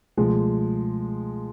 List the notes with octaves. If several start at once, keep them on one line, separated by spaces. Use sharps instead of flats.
C#2 B2 F3 G#3 A3